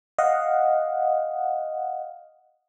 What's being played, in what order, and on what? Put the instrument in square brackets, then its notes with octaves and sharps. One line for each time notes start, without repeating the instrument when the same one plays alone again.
[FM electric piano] D#5 F5 F#5